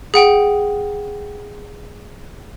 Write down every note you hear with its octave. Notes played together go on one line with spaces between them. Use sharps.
G#4 F#5 G5